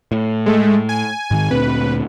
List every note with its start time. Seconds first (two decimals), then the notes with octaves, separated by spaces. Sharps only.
0.12 A2
0.46 G#3 A3
0.89 G#5
1.31 G#2 D#3
1.51 D2 A#2 C4 B4